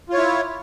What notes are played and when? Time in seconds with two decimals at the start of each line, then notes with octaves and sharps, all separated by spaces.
0.10 F4
0.14 C#5
0.17 E4